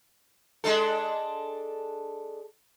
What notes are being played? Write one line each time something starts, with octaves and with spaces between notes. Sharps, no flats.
G#3 D4 A4